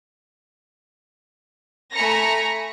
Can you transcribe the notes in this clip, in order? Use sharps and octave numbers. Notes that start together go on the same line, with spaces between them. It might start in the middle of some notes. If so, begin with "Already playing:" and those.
A3 G#5 A#5 B5 A#6 C#7